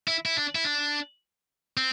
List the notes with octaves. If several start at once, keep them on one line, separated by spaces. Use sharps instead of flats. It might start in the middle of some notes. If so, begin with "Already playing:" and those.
E4
E4
D4
E4
D4
C4